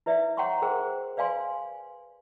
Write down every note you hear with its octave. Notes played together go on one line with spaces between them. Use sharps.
E4 B4 D5 E5
C#5 F#5 G5 A#5 C6 C#6
G#4 A#4 C5 G5
B4 D5 F5 G#5 C6